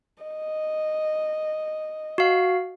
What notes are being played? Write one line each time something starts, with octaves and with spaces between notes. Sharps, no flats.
D#5
F#4 F5